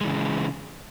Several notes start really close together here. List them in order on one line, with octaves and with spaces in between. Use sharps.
G#3 E3 C#3